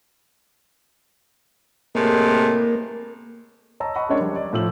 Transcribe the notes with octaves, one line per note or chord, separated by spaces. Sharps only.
A2 C3 G#3 A#3
C#5 D#5 A5 A#5 E6
D#5 F#5 B5 C#6
G#3 C#4 D4 A#4 C#5 D5
G3
D5
A2 F3 E6 F#7